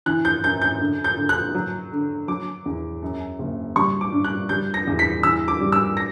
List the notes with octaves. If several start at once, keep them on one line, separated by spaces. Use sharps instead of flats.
E3 F#6
G6
F#2 G6
G6
D3
G6
D3
F#6
F#3
D3
F#3 D6
E2
F#2
F#1
G3 C#6
D6
G2
F#6
G3 G6
A#6
E2
B6
E3 E6
D6
G3
E6
A#6